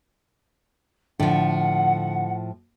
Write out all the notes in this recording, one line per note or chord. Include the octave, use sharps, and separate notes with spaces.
A2 D3 F3 F#5